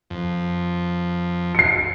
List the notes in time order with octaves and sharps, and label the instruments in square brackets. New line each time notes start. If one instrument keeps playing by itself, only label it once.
[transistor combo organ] F2
[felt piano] C7 C#7